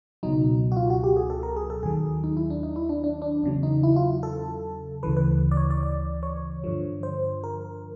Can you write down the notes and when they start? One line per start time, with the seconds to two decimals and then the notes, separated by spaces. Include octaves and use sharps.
0.23 C#2 B2 F#3 D#4
0.72 F#4
0.76 F4
0.90 F#4
1.04 G4
1.17 G#4
1.30 A4
1.43 A#4
1.57 G#4
1.70 A4
1.83 D#2 D#3 F#3 G#4
2.24 D#4
2.37 E4
2.50 D4
2.63 D#4
2.76 E4
2.89 D4
3.04 D4
3.22 D4
3.43 E2 C#3 F#3
3.63 D#4
3.83 E4
3.96 F4
4.23 A4
5.03 D2 C#3 E3 B4
5.17 B4
5.51 D5
5.57 C#5
5.70 D5
5.83 D5
6.23 C#5
6.64 G2 D3 F3
7.03 C5
7.44 A#4